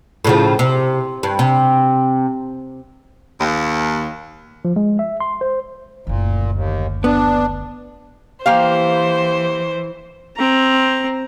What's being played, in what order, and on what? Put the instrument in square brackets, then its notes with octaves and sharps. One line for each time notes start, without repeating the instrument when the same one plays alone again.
[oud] A2 C#3 F3
C3
G2
C3
[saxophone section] D#2
[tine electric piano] F3
G#3
E5
C6
C5
[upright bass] F#1 D2 [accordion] A#2
[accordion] D#2
[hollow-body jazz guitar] B3 [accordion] D4
[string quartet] E3 C5 [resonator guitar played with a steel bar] A#3 G4 F5
[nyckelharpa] C4 A#5